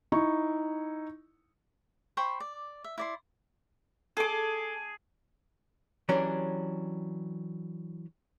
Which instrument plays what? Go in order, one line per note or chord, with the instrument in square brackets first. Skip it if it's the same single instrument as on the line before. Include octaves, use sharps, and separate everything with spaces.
[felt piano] D#4 E4 C#6
[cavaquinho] C5 G5 B5 C#6
D5
E5
E4 D5 C6
[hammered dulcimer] G#4 D6 [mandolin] A4
[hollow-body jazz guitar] E3 F#3 C#4 D4 G4